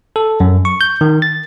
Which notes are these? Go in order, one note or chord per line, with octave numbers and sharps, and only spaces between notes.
A4
F#2
C#6
G6
D#3
A6